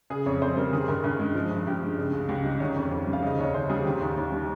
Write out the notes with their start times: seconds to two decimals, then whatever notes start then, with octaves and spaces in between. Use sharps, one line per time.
0.10 C#3 G#4
0.26 F2 C#5
0.42 F2 C5
0.57 G3 A#4
0.72 D#3 G#4
0.88 G2 A#4
1.04 G2 G#4
1.19 G#3
1.35 F3
1.51 G2
1.67 G2 G4
1.82 G#3
1.98 C#3
2.13 C#2
2.29 C#2 G4
2.45 G3 D#4
2.60 D#3 C#4
2.76 F2 C#4
2.91 F2
3.07 G3
3.13 F5
3.22 C#3 D#5
3.39 D#2 C#5
3.54 D#2 C5
3.69 G3 G#4
3.85 D#3 G4
4.01 D#2
4.16 D#2
4.32 G3